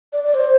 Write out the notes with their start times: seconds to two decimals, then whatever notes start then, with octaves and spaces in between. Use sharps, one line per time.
0.13 D5
0.24 D5
0.34 C5